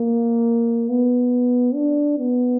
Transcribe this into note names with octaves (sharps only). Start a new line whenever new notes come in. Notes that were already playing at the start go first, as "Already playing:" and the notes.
Already playing: A#3
B3
D4
B3